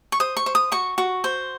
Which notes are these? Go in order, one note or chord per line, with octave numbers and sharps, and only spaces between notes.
C#6
C5 D#6
C#6
C5
D#6
F#4 C#6
F#4
C5